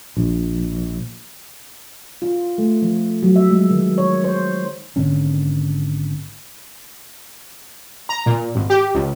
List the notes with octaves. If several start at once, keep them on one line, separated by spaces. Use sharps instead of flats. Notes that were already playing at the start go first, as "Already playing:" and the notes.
A#1
F4
A3
F3
F#3
E5
G#3
D#3
C#5
C5
G#1 D3 A#3 C#4
A#5
A#2
G#1
G4
C#2